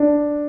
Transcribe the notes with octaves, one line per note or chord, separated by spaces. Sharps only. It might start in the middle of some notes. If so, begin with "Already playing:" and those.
Already playing: D4